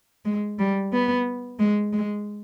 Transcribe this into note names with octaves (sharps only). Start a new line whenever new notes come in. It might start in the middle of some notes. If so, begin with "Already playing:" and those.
G#3
G3
B3
G#3
G#3